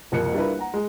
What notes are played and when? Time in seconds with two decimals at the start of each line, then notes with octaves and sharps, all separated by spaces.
0.12 F#1 C2 F3 A#3 F#6 C#7
0.34 G3 D4 E4 F4 A#4 B4
0.59 F#5 A#5
0.74 G#3 G#4